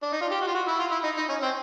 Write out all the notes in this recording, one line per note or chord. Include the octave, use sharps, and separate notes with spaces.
D4
D#4
F4
G4
F#4
F4
F#4
E4
F4
E4
D#4
D#4
C#4
C4